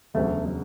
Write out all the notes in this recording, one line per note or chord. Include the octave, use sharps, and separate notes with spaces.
E1 D2 C#3 F#3 A3